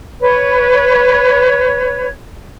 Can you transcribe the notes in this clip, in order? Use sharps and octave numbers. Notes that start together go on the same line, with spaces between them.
B4 C#5